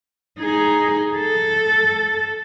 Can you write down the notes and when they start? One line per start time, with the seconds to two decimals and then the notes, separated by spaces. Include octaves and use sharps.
0.40 D#4 G#4
1.17 A4